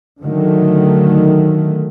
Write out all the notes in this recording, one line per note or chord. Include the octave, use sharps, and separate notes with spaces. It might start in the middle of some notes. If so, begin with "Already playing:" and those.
D3 D#3 F#3 A3